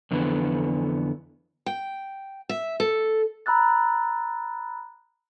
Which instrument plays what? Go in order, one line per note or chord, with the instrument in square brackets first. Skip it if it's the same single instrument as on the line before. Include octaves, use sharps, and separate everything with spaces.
[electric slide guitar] F2 D3 E3 B3
[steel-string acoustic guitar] G5
E5
A4
[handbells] A#5 B5 E6 F#6 A6